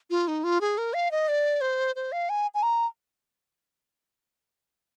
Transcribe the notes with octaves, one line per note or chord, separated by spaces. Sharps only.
F4
D#4
F4
G#4
A#4
F5
D#5
D5
C5
C5
F5
G#5
G#5
A#5